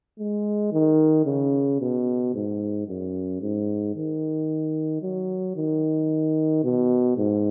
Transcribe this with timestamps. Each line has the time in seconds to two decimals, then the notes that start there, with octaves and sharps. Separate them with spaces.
0.19 G#3
0.72 D#3
1.26 C#3
1.80 B2
2.34 G#2
2.87 F#2
3.41 G#2
3.95 D#3
5.02 F#3
5.56 D#3
6.63 B2
7.17 G#2